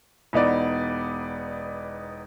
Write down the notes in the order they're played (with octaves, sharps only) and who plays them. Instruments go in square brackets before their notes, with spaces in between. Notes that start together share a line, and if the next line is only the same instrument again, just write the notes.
[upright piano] E1 B3 D#4 D5